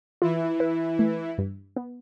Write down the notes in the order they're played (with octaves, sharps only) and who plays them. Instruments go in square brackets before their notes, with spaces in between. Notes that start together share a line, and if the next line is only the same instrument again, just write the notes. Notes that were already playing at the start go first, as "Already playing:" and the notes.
[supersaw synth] E3 E4 [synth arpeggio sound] F4
[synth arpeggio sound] B4
A3
G2
B3